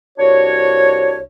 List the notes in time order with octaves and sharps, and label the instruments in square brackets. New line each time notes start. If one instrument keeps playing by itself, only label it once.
[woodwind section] C2 D4 F#4 C#5